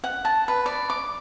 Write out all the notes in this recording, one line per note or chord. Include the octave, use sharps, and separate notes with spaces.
F#5
A5
B4
D5
D6